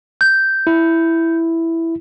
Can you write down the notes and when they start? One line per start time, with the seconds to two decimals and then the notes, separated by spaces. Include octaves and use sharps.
0.21 G6
0.67 E4